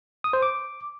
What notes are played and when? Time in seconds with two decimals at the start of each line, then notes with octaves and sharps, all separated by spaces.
0.24 D#6
0.33 C5
0.42 D6